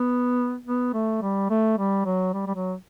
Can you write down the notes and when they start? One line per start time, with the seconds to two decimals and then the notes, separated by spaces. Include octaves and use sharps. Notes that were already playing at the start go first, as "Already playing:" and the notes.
Already playing: B3
0.66 B3
0.94 A3
1.22 G3
1.50 A3
1.78 G3
2.05 F#3
2.34 G3
2.47 G3
2.55 F#3